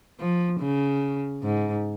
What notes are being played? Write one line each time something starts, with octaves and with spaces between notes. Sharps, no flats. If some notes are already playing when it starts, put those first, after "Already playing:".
F3
C#3
G#2